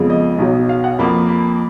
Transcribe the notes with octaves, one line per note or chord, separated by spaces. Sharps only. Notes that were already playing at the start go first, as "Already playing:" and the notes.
Already playing: F2 C#3 F3 G#3 B3
D#5
B1 B2 F#3
F5
F#5
F2 F3 A#3 B5
B5